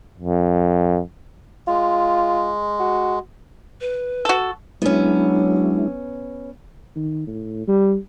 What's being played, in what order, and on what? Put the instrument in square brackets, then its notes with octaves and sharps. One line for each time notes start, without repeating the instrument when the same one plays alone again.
[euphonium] F2
[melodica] G#3 [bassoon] F4
[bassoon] F#4
[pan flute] B4
[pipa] F#4 A4
[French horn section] F#3 [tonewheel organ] G#3 E4 [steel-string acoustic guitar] B3 C#4 [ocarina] D4
[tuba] D#3
A2
G3